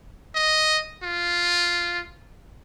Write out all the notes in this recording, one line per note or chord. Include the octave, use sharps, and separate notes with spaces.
D#5
F4